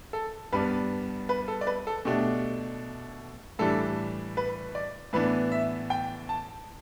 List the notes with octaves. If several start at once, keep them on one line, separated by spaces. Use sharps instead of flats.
A4
G2 G3 B3 D4 B4
B4
A4
D5
B4
A4
B2 A3 D4 G4
A2 E3 G3 D4 A4
B4
D5
A2 E3 B3 D4 B4
E5
G5
A5